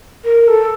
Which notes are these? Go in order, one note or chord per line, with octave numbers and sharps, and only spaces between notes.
A#4
A4